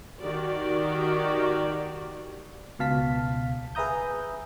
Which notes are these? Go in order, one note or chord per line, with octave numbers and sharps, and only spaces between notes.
D#3 F#4 G4 D5
C#2 B2 F5 A5 B6
G#4 B4 E5 A#5 D#6 G6